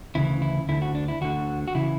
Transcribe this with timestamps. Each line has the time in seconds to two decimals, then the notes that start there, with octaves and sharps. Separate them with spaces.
0.15 D2 C#3 E3 E4
0.42 E4
0.69 D2 D3 E4
0.82 F#4
0.95 D4
1.08 E4
1.21 D2 D3 F#4
1.68 F#4
1.75 C#3 E3 E4